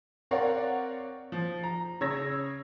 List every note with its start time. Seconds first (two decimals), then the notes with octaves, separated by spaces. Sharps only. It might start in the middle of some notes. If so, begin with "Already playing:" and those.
0.31 C4 A#4 C#5 D5 F5 F#5
1.32 F3
1.64 A#5
2.01 C#3 C#5 E6 G#6 A#6